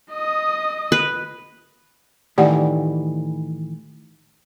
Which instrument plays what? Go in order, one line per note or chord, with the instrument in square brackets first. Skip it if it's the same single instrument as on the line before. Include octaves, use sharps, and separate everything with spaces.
[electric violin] D#5 D#6
[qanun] B4
[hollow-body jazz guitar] A2 D#3 E3 [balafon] G4 D5 F#5